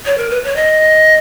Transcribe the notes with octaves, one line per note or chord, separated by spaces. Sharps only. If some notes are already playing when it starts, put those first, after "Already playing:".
C#5
A#4
B4
C#5
D#5